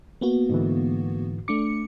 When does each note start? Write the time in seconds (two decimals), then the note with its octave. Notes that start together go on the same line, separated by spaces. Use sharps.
0.21 A#3 B3 F#4
0.49 G#2 D3 E3
1.48 A3 D4 D6 C#7